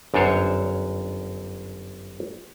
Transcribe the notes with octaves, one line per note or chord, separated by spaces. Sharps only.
G1 F#2 D4 C5 C#5